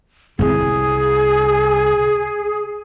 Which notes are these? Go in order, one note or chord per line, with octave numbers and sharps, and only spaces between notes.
C2 C3 G#4